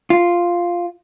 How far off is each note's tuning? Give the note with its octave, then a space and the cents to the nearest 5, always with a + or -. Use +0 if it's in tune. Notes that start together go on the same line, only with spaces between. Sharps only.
F4 +0